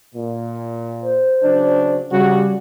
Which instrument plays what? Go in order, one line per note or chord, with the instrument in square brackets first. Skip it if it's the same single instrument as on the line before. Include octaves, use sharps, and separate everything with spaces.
[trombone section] A#2
[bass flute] C5
[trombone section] C#3 F#3 D4
[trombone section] C#3 F#4 [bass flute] G3